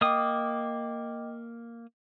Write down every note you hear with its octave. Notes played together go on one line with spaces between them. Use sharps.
A#3 D#5 G5 D6 D#6